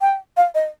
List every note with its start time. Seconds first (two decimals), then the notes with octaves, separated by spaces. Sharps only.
0.01 G5
0.37 F5
0.55 D#5